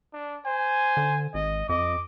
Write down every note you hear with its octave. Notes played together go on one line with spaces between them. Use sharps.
D4
C5 G#5
D3
G#1 D#5
F2 D#5 D6